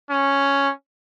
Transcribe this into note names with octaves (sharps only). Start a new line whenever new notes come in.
C#4